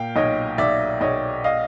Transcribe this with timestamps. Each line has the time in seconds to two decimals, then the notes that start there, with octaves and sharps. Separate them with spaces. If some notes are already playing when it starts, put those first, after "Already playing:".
Already playing: A#2 F5 G5
0.16 B1 C#5 D#5
0.58 B1 D5 E5
1.01 B1 C#5 D#5
1.44 D#5 F5